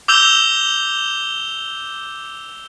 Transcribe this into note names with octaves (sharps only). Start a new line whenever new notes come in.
D6 E6 G6 E7 F7 G7